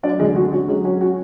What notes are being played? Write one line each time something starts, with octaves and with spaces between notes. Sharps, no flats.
F#3 D4 D5
D2 G#3 G#4
D3 F#4
C#4 F#4
F#3 G#3 G#4
C#4 F#4
F#4